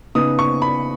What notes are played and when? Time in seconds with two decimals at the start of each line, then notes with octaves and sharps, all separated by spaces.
0.15 C#3 B3 D#4 D#6
0.39 C#6
0.62 B5